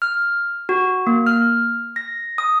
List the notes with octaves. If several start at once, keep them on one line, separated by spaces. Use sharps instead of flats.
F6
F#4
A#3
F6
A#6
D#6